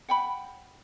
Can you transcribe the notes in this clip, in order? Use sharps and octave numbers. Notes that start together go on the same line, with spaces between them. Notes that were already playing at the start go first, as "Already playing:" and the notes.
F#5 G5 B5